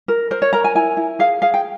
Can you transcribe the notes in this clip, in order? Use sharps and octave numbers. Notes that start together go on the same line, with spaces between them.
A#4
A#4 C5
C#5
A#4 A#5
G#5
E4 G#5
E4
G#4 F5
G#4 F5
G5